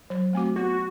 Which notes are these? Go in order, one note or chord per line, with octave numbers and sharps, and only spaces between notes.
F#3
A3 C4 F#4
B3 F#4